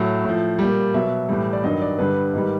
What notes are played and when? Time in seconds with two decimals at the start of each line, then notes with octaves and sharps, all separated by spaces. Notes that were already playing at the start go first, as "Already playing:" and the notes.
Already playing: A2 F#3 E5
0.25 A2 F3
0.59 A#2 G3
0.94 B2 F#3 E5
1.29 A2 E3 G3
1.53 D5
1.64 G2 D#3 F#3 D#5
1.82 D5
1.99 G2 D3 G3 B4
2.33 G#2 D#3 G3